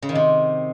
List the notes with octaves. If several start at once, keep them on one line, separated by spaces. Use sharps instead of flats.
C#3
D#3
C3